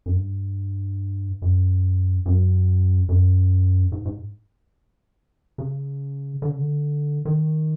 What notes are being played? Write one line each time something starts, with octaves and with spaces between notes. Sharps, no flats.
F#2
G2
F#2
F#2
F#2
G#2
G#2
C#3
D3
C#3
D3
D#3